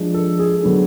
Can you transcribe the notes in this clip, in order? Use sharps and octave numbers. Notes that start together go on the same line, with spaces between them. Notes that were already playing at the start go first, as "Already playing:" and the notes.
Already playing: F3 G#3 D4
A4
G#4
D3 F#3 B3 D4